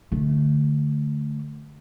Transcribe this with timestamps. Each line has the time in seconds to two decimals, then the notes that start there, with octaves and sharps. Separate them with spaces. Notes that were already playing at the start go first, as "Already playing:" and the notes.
0.12 D3 A3